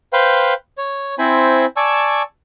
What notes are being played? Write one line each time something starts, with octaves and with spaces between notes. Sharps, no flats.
B4 C5 F5 G5
C#5
C4 E4 C5 G#5 B5
D5 G#5 A5 C#6 E6